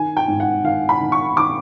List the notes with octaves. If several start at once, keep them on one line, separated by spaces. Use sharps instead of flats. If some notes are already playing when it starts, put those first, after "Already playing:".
Already playing: D#3 G#5
G5
G#2
F#5
D#3 F5
B5
D#3
C#6
D#3 D6